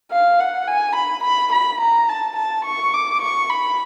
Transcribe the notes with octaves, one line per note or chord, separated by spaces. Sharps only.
F5
F#5
G#5
B5
B5
B5
A#5
A5
A5
C#6
D6
C#6
B5